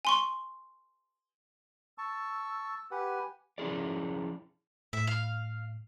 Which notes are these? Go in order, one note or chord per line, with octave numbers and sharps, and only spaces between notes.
G#5 C6 C#6
A5 C#6 E6
G4 B4 F#5 G#5
F3 C#4 E4 G#4 D5
A2 E5
F5